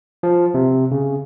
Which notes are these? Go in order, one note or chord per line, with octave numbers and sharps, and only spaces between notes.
F3
C3
C#3